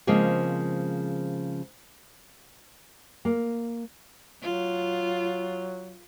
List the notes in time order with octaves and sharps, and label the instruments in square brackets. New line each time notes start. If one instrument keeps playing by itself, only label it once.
[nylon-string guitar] C#3 F3 G#3 A#3 C4
A#3
[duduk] F#3 [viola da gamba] F4